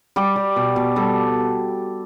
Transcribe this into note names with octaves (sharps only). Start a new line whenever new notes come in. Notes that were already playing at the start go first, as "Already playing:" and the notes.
G3 G4
G3
B2
B2
G3 A4